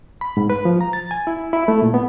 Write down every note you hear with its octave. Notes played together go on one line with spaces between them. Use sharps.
B5
G#2
B4
F3
A#5
A6
G#5
E4
E4
A3
A#2
B3